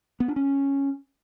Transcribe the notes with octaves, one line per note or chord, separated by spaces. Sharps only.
B3
D4
C#4